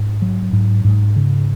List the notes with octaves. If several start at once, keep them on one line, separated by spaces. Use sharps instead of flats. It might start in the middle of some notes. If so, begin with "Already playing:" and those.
Already playing: G#2
F#3
G#2
G#2
C#3